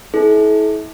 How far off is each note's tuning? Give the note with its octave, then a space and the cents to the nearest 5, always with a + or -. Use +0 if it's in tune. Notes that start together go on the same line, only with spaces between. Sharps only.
E4 -35 A4 -45